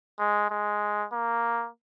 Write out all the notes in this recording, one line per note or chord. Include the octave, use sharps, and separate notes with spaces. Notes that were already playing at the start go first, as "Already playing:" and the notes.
G#3
G#3
A#3